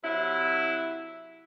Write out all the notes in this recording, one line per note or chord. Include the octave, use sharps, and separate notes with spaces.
C3 F#3 E4